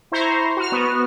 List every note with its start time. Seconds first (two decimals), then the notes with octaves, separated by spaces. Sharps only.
0.12 E4 C5 A#5 C#6
0.57 F#4 F6
0.72 B3 F#4